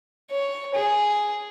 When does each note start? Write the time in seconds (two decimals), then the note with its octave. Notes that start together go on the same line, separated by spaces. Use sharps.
0.30 C#5
0.74 G#4